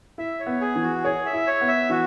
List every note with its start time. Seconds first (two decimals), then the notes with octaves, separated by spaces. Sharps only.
0.18 E4 E5
0.40 C#5
0.46 B3
0.61 G#4
0.75 E3
0.83 F#4
1.05 G#4 C#5
1.26 E5
1.33 E4
1.47 C#5
1.61 B3
1.68 E5
1.90 E3 F#4